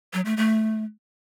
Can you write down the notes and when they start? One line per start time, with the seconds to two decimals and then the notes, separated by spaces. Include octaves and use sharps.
0.13 F#3
0.25 A3
0.37 A3